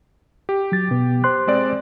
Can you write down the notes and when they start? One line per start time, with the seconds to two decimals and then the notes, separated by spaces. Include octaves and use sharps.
0.49 G4
0.72 F#3 A6
0.91 B2 B3
1.24 C5 C6 F#6
1.47 G#3 C4 D5